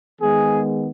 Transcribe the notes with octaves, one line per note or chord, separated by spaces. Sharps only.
D#3 G#3 B3 G#4